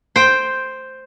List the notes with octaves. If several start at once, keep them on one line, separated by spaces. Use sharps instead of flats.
C5 G5